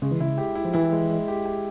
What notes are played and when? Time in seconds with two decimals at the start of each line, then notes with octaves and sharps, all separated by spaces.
0.02 C#3 G#3
0.11 E3
0.20 C#3 E4
0.38 G4
0.55 E4
0.65 F3
0.73 E3 E4
0.92 G#3
1.10 G#3
1.28 G4
1.45 G4